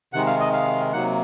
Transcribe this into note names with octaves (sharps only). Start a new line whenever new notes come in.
C3 D#3 G#3 F#5
F5
D#5
F5
C3 F#3 A#3 F#5